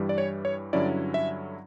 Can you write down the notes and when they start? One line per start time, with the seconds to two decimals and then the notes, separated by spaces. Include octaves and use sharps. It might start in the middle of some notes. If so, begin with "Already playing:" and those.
Already playing: G2 E3 G3
0.09 D5
0.18 C#5
0.45 C#5
0.73 G2 D3 F#3 C#4 E4 D5
1.14 E5